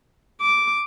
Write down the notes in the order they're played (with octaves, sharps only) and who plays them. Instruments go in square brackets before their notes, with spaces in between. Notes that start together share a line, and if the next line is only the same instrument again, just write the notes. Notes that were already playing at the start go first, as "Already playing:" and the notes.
[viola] D6